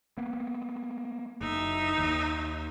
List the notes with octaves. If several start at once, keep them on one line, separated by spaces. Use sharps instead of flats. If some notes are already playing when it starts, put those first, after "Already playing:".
A#3 B3
F#1 D#4 E5
D#2